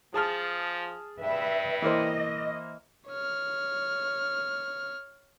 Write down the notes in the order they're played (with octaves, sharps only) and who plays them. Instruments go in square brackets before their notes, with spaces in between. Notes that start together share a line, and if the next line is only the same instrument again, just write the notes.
[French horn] F3 [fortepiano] G#4 A5 F6
[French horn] G2 [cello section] B4 E5
[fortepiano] E3 A#3 C5 [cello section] D#5
[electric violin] C#5 F6